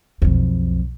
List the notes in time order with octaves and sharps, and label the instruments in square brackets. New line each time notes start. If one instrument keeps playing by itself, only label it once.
[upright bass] B1 F2